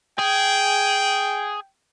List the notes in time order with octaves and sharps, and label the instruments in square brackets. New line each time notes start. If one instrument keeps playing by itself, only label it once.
[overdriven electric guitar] G#4 [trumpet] G5